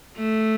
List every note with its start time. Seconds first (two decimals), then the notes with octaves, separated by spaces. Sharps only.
0.17 A3